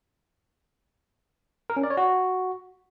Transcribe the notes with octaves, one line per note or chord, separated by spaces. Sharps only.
A#4
C#4
D5
C#5
F#4